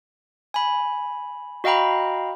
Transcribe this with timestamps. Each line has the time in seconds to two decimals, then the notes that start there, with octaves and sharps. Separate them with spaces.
0.54 G#5 B5
1.64 F#4 D#5 F5 G5 A#5 B5